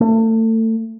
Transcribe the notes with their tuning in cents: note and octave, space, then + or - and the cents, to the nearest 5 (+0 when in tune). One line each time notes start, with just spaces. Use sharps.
A3 +30